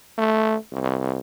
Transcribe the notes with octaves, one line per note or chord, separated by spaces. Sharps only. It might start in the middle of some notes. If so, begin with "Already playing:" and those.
A3
C2